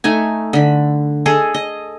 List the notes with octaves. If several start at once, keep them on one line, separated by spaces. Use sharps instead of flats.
A3 D#4 G#5
D3 B5
G#4 A4 D#5
D#5